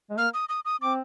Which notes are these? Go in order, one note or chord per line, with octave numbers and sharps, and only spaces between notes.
G#3
A#3 F6
D#6
D#6
D#6
C4 D6